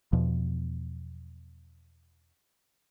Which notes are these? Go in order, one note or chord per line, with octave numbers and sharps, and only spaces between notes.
E2 B2 F3